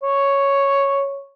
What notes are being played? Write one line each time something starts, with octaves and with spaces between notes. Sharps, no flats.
C#5